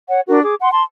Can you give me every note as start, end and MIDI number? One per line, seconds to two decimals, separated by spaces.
0.09 0.21 73
0.09 0.21 78
0.29 0.40 62
0.29 0.40 66
0.29 0.40 70
0.43 0.55 68
0.43 0.55 86
0.61 0.72 78
0.61 0.72 84
0.72 0.83 81
0.72 0.83 84